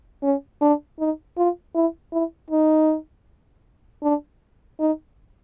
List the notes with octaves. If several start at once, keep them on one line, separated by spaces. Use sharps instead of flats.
C#4
D4
D#4
F4
E4
E4
D#4
D4
D#4